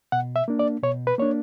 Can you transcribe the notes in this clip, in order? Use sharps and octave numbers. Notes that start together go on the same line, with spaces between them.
B2 F#5
E5
A#3 D4
D5
B2 C#5
B4
A#3 D4 C#5